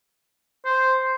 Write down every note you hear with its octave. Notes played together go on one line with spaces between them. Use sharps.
C5